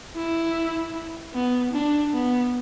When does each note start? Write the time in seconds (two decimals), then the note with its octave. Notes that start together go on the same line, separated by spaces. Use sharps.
0.16 E4
1.34 B3
1.73 D4
2.14 B3